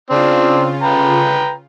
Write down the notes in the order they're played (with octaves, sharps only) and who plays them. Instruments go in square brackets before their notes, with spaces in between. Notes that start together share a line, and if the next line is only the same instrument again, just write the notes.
[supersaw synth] C#3 F4 [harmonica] C4 D4
[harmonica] B4 G5 A#5